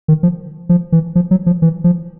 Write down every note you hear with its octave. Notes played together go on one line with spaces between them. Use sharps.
D#3
F3
F3
E3
F3
F#3
F3
E3
F3